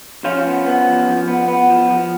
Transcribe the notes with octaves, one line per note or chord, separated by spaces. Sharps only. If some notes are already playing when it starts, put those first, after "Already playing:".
F3 C#4 F4
B3
B3
F3
F3
B3
B3
F3
F3